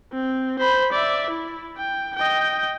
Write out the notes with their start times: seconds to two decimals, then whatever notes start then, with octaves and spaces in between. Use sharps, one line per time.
0.12 C4
0.59 C5 B5
0.92 D5 E5
1.30 E4
1.78 G5
2.16 D#5 G5